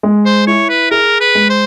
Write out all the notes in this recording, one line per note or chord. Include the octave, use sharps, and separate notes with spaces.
G#3
C5
E4 C#5
B4
G#4 A#4
B4
G#3
C5